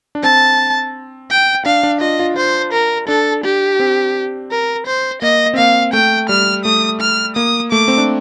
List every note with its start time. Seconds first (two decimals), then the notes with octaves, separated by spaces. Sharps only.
0.15 D4
0.23 C4 A5
1.30 G5
1.66 D4 F5
1.83 D4
2.01 F4 D#5
2.19 F4
2.37 F4 C5
2.73 A#4
3.08 D4 A4
3.44 G4
3.80 C4
4.51 A#4
4.87 C5
5.22 A#3 D#5
5.54 C4
5.58 A#3 F5
5.93 A3 G5
6.29 G3 F6
6.65 A3 D#6
7.01 F6
7.36 A#3 D#6
7.72 A3 D6
7.88 C4
7.98 D4